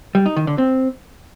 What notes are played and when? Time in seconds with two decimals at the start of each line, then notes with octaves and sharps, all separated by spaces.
0.15 G3
0.26 D#4
0.36 D#3
0.47 D3
0.58 C4